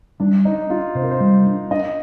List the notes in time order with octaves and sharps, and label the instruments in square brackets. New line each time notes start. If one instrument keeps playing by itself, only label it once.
[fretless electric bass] G3 [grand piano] D4
[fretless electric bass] D4 [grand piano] D#4
[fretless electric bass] D4 [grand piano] F4
[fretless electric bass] C3 [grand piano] C5
[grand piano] A#4
C5
[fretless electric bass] G3
D4
[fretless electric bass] D4 [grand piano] D#5